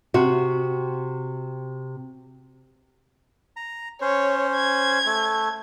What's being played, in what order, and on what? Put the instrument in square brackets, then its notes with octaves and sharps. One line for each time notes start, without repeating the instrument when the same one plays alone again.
[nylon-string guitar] C3 F#4
[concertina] A#5
[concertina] C#4 C5 [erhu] C#5
[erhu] G#6
[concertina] A3